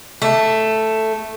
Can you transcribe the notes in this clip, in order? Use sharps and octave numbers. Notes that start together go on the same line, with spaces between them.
A3